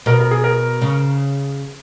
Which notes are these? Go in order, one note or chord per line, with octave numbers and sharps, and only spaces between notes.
B2 A#4
A#4
G#4
A#4
C#3